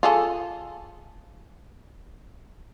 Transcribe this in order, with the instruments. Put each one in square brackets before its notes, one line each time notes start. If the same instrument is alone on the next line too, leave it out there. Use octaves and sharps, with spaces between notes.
[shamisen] F4 G#4 A4